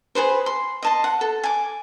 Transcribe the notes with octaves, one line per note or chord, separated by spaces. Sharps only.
G#4 A4 B4 C5
C6
D#5 A5 C6
F#5
A4
G#5 D6